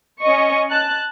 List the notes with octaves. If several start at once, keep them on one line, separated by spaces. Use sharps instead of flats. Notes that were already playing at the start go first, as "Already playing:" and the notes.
C#4 D#5 C#6
A5 F#6